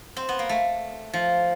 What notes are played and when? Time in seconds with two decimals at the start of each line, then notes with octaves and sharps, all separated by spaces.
0.17 C4
0.29 B3
0.39 A#3
0.49 A3
1.14 F3